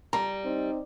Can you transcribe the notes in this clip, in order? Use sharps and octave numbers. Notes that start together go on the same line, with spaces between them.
G3 A#5
C4 D#4